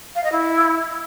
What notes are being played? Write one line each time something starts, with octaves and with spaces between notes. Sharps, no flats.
F5
D#5
E4